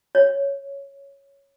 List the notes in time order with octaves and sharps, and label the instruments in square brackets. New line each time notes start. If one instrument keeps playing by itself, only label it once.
[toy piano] C#5